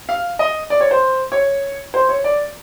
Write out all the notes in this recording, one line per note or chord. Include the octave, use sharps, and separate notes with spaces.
F5
D#5
D5
C#5
C5
C#5
C5
C#5
D5